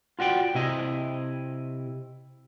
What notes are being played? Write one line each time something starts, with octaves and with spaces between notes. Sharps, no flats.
F4 F#4 D5 G5
C3 E4 D#5